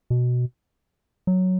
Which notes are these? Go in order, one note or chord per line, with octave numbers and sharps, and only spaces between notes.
B2
F#3